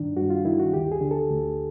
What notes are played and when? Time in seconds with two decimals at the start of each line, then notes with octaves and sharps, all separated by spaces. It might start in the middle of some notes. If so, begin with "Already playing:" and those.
Already playing: G2 D#3 D4
0.17 G2 F#4
0.30 F4
0.45 D#3 E4
0.60 F#4
0.73 D2 G4
0.92 G#4
1.01 D3
1.11 A4
1.31 D2